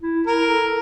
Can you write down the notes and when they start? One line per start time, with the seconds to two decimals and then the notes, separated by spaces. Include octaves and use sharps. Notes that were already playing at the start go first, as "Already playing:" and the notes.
0.02 E4
0.27 E4 A#4
0.48 A4